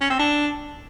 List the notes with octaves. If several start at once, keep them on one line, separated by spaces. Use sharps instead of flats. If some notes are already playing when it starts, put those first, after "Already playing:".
C#4
C4
D4